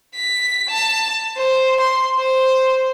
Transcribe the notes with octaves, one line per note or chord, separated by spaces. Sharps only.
B6
A5
C5
C6
C5